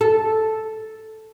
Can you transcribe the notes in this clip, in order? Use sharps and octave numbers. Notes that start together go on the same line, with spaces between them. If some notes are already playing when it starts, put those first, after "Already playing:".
A4